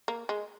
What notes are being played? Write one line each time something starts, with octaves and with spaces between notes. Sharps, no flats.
A#3
G#3